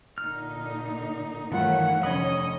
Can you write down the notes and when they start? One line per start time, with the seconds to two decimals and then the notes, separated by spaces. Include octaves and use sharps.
0.18 A#2 D3 D#4 F6
1.52 G2 D#3 E3 A3 F4 C#5 F#5
2.03 F1 D3 C#4 C#5 D#5 B5 D#6 G#6